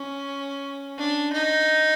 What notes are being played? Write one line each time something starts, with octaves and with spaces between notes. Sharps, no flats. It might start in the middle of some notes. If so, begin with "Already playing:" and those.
Already playing: C#4
D4
D#4